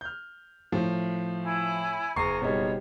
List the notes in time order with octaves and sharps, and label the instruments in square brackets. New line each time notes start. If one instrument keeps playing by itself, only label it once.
[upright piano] F6 G6
[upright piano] A2 [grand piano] F3
[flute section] E4 G#5
[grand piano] F#1 C#6 C7 [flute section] G#5 A#5
[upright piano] B2 G3 D#4 [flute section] C#5